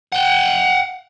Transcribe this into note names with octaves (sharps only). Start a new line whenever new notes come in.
F#5 G5